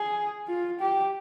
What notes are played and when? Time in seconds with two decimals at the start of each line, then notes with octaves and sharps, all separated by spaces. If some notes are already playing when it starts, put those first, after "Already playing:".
Already playing: G#4
0.48 F4
0.80 G4